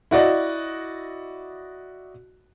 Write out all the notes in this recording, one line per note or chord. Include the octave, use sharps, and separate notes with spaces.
E4 F#4 D5 D#5